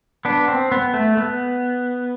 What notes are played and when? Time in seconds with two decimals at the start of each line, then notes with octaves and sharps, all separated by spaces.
0.25 B3 D4
0.48 C4
0.72 B3
0.94 A3
1.17 B3